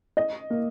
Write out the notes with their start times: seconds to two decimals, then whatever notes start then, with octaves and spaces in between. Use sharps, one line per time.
0.17 D#5
0.50 A#3